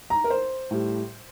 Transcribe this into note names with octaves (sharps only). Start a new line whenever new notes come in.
A#5
A#4
C5
A2 G3